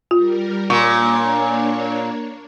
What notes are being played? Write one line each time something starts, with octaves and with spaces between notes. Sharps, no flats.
G3 F4 A#4
A#2 A#3 D4 C#5 C#6